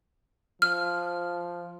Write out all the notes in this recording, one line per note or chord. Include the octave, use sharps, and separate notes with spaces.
F3 F6